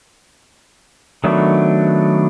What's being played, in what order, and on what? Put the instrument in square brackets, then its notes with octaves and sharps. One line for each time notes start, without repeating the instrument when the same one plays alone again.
[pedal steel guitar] D#3 F#3 A3 B3 D4